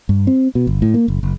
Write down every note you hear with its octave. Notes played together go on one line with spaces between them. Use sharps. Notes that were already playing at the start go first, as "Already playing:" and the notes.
G2
C4
B2
G1
A2
A#3
F#1
F#1